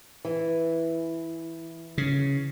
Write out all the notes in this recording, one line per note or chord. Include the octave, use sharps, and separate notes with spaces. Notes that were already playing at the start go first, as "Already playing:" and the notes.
E3
C#3